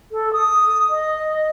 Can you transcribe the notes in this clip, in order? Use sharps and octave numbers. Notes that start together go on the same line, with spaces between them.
A4
D#6
D#5